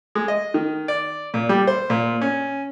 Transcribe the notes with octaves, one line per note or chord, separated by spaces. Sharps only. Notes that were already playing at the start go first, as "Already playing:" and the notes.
G#3
D#5
D#3
D5
A#2
G3
C5
A#2
C#4